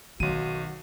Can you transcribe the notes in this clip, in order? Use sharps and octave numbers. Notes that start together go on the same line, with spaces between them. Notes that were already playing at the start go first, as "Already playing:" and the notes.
B1 D#3 F#4 D#7